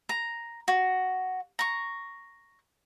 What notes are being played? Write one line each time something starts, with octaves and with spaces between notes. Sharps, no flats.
A#5
F#4
A#5 C#6